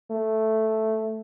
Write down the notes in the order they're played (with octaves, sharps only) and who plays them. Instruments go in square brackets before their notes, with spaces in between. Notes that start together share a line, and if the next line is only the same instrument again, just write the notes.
[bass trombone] A3